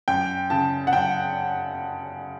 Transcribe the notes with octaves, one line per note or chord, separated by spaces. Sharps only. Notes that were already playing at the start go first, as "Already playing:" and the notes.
F#2 G5
C#3 A5
F#5
F#2 G5